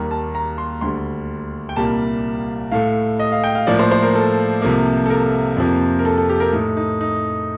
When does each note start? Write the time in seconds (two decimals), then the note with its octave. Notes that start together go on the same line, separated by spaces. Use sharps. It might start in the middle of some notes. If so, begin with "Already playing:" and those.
Already playing: D#2 D#3 G3 A#3 A#5
0.11 A5
0.35 A#5
0.58 C6
0.81 D2 D3 G3 C6
1.69 G5
1.76 C2 A#2 G3 A#3 A5
2.72 A2 A3 F5
3.19 D#5
3.32 F5
3.44 G5
3.55 F5
3.67 A2 F3 A#3 D5
3.79 C5
3.92 C5
4.03 A#4
4.15 A4
4.62 C2 C3 F3 A#3
5.06 A4
5.10 A#4
5.57 F2 C3 F3 A#3
5.99 A#4
6.05 A4
6.18 A4
6.29 G4
6.40 A#4
6.53 A2 A3 D#4
6.77 D#4
7.01 D#4